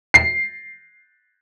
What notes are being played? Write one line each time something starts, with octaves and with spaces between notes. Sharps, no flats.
C7